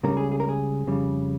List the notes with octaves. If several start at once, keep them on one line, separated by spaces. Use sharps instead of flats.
C#2 C#3 G3 A#4
G#4
G#4
A#4
G#4
F2 C#3 G3